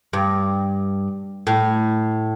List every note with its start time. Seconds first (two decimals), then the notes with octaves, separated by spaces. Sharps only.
0.13 G2
1.47 A2